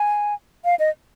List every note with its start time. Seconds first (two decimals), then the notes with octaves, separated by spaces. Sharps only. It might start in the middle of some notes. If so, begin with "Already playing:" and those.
Already playing: G#5
0.65 F5
0.79 D#5